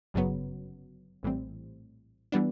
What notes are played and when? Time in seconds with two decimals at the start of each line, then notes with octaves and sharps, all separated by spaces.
0.14 G1 F#2 C#3 F#3 B3
1.23 A#1 A2 E3 G3 C4
2.32 E3 G3 B3 D4